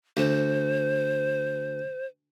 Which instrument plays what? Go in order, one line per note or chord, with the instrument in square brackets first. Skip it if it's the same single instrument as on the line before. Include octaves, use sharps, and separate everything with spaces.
[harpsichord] D2 [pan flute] C5